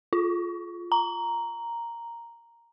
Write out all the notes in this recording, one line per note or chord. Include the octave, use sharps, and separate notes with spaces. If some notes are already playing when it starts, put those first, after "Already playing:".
F4
A#5